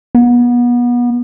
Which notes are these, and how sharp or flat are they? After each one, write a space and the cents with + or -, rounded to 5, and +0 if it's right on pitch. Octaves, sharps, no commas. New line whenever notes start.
B3 -30